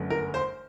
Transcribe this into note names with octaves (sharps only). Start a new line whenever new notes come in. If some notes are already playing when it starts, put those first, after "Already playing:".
Already playing: G1 F#2 F#3 A3
A#4
C5